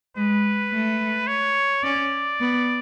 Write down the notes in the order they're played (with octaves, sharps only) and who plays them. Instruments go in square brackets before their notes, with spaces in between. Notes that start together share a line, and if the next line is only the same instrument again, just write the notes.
[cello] G#3 [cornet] B4
[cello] A3
[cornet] C#5
[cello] C#4 [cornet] D5
[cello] B3